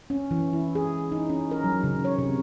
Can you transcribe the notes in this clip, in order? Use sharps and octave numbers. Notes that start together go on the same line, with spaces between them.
C#4
E3
E4
G#4
D#4
C#4
A#4
F#3
C#3
C#5
C3